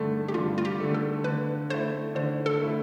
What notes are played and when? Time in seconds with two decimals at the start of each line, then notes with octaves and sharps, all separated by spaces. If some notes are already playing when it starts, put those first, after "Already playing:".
Already playing: G2 D3 A3
0.28 G4
0.34 G2 F4
0.58 F4
0.65 G4
0.80 D3 A3
0.94 A4
1.24 D3 B4
1.70 A3 E4 C5
2.15 D3 C5
2.46 A4
2.60 A3 E4